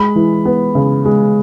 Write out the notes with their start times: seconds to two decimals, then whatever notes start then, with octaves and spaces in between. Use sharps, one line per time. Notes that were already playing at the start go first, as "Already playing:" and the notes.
Already playing: G#3 B5
0.16 E3
0.45 B3
0.75 C#3
1.05 G#3